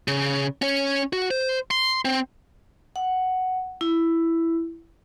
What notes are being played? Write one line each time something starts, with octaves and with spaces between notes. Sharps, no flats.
C#3
C#4 C#5
F#4
C5
C6
C4
F#5
E4